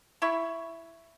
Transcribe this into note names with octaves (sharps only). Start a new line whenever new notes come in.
E4 B5 C#6